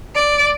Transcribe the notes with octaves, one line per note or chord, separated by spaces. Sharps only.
D5